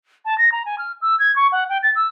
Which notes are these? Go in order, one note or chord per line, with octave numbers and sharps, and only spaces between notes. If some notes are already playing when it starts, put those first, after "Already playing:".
A5
A#6
A#5
G#5
F6
E6
G#6
C#6
F#5
G5
A6
E6